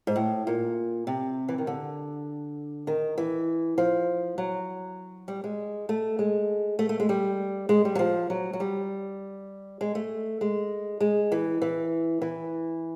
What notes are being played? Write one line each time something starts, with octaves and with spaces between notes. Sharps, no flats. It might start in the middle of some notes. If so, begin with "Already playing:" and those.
G#2
A2
A#2
C3
E3
D#3
D3
D#3
E3
F3
F#3
G3
G#3
A3
G#3
A3
A3
G#3
G3
G#3
G3
F#3
F3
F#3
F#3
G3
G#3
A3
G#3
G#3
E3
E3
E3